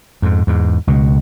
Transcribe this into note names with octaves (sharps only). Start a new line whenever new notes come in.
F2 G#2
E2 G#2
C#2 B2